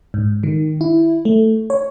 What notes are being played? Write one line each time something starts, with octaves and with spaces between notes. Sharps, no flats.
G#2
D#3
E4
A3
C#5